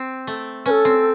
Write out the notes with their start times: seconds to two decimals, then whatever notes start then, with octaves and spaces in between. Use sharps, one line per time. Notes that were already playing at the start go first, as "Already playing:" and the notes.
Already playing: C4
0.27 A3
0.66 C#4 B4
0.70 A4
0.85 C4